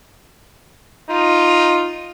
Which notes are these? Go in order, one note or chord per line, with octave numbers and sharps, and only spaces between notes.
D#4 F4